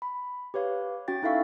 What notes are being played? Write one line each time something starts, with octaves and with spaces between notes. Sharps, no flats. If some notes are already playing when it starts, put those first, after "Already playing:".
B5
G4 B4 C#5 F5
C#4 F#4 G5 A6
D#4 E4 A4 E5 F5 C#6